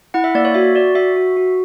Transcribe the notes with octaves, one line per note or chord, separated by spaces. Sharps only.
E4 F#5
E5
A#3 D5
C#5
F#4 E5
F#4 D5
F#4 E5
F#4
F#4